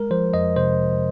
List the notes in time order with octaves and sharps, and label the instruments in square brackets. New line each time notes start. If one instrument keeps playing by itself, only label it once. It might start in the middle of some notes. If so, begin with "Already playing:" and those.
Already playing: [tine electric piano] G#3 A#4
F3 C5
F2 D#5
C3 C5